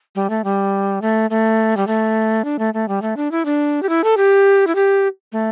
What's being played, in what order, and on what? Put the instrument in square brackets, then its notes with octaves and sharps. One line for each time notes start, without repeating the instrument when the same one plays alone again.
[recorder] G3
A3
G3
A3
A3
G3
A3
D4
A3
A3
G3
A3
D4
E4
D4
G4
E4
A4
G4
E4
G4
A3